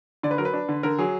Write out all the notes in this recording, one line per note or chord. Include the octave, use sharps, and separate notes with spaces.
D3 D5
B4
F#3 A#4
B4
D4
D3
D3 A#4
F#3 G#4